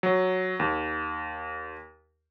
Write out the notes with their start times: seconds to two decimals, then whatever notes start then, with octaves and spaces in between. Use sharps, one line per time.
0.03 F#3
0.60 D#2